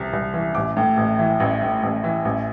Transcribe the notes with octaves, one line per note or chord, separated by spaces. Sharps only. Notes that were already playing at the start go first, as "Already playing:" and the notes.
Already playing: C2 C3 E3
C2
E3
A1 D6
A2
A1
E3
A1
A2
A1
E3
A1